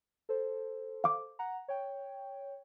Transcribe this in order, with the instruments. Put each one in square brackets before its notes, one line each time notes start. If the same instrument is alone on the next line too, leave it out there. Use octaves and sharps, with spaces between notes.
[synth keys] A4 C5
[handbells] F5 D6
[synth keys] F#5 A#5
C#5 G5